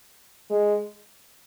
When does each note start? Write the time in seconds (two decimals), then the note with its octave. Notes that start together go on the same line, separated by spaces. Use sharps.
0.50 G#3